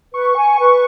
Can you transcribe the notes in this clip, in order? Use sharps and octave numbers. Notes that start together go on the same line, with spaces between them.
B4 C#6
G#5 C#6
B4 C#6